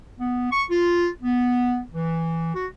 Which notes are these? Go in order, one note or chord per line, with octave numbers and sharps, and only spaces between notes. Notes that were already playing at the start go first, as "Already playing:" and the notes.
B3
C#6
F4
B3
E3
F#4